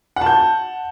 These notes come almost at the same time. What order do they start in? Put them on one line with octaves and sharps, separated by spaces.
F#5 A5 G6